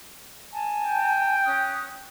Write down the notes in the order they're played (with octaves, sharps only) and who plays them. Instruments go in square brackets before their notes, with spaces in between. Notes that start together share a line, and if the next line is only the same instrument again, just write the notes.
[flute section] G#5 A5
[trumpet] G5
[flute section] C#4 D#6 F#6